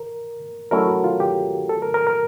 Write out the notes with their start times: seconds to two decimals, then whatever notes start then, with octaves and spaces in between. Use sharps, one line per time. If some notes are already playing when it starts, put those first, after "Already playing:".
Already playing: A#4
0.71 F#3 A3 C#4 E4 A#4
0.87 F#4
1.04 F4
1.20 G4
1.69 A4
1.82 A#4
1.94 A#4
2.07 A#4